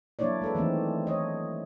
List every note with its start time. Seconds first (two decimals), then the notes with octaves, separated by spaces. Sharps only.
0.19 F#3 A#3 D4 E4 C#5 D5
0.42 G#3 A4 B4
0.55 D#3 E3 A3 C4
1.07 C#5 D#5